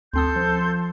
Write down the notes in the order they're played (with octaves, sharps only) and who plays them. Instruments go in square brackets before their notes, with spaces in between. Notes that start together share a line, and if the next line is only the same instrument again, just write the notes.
[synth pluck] D2 C4 D#6 [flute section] A4 C6 G6
[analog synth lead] F3